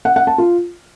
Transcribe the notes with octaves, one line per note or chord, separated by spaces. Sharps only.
F#5
F#5
A5
F4